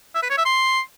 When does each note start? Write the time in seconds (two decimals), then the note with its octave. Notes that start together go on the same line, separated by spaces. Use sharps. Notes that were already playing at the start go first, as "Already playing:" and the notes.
0.15 E5
0.23 B4
0.30 C#5
0.38 E5
0.45 C6